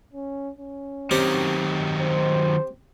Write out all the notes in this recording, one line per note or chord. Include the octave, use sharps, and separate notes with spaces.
C#4
C#4
D#3 F#3 C4 G4
C5